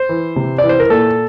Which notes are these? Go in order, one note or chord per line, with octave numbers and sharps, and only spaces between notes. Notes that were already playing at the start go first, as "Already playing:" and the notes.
Already playing: C5
E3
C3
D5
E3
C5
A#4
A#2 A4